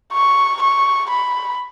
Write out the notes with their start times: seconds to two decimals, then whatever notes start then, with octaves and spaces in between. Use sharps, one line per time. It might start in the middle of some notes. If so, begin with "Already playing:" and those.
0.13 C#6
0.62 C#6
1.10 B5